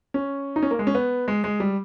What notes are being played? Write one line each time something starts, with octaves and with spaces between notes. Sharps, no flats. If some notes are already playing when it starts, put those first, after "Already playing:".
C#4
D#4
C#4
A#3
G#3
C#4
B3
G#3
G#3
G3